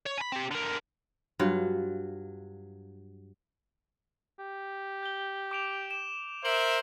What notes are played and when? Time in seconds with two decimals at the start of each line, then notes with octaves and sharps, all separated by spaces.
0.06 C#5
0.18 G#5 B5
0.32 C4 G4
0.51 D3 A#4
1.39 G2 F#3 F4
4.39 G4
5.03 G6 G7
5.51 D6 D7 F7
5.91 E7
6.45 A#4 C5 E5 D7 E7 F#7